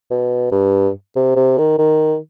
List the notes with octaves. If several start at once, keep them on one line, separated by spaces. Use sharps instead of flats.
B2
G2
C3
C3
D#3
D#3